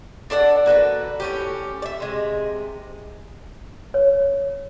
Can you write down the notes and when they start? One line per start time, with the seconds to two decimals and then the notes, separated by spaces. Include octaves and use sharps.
0.30 D4 A4 D5 F#5
0.66 A#3 F#4 A4 B4
1.20 A2 C#4 G4
1.82 D5 E5
2.00 C3 G#3
3.94 C#5